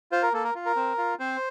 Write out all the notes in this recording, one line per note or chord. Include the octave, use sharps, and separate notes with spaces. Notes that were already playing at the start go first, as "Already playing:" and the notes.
F4 C5
A#4
A#3 A4
A#4
F4
A#4
C4
F4
C4 C5